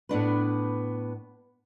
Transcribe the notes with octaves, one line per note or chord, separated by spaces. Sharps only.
A2 B3 D4 B4